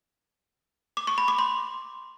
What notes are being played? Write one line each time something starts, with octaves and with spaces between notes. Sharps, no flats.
D6
C#6
B5
D6
C6